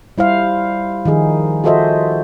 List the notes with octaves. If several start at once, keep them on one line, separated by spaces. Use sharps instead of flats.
G3 E4 C5 F5
D#3 F3 D#4 G#4
F4 F#4 A4 C5 D#5 E5